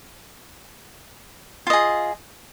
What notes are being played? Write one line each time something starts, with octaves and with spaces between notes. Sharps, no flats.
F4 G#4 D#5